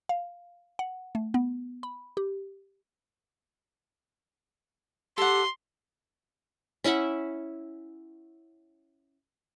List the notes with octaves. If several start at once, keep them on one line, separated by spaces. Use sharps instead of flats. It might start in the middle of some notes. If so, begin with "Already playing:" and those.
F5
F#5
A3
B3
B5
G4
G4 A4 F#5 C6
C#4 E4 E5 F#5